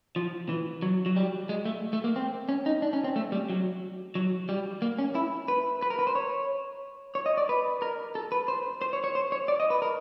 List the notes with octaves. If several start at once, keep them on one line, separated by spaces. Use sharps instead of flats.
F3
E3
F#3
F#3
G3
G#3
A3
A3
A#3
C4
C#4
D#4
D4
C#4
C4
A3
G3
F#3
F#3
G3
A#3
C#4
E4
B4
B4
A#4
B4
C5
C#5
C#5
D#5
D5
B4
A#4
A4
B4
C5
C5
C#5
C#5
C5
C#5
D5
D#5
B4
A#4